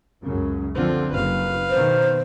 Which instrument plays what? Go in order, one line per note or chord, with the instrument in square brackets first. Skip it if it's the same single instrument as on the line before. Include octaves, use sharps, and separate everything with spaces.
[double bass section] C#2 F#2 C#3
[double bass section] D3 F3 [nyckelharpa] C4 F4
[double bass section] F#1 [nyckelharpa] B4 F5
[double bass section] B2 D#3 [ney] C5